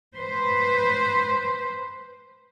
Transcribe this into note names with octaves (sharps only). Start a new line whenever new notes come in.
B4 C5